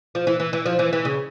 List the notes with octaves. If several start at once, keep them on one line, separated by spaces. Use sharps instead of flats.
F3
E3
E3
E3
F3
E3
E3
C#3